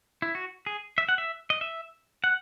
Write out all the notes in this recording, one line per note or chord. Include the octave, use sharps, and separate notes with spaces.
E4
F#4
G#4
E5
F#5
E5
D#5
E5
F#5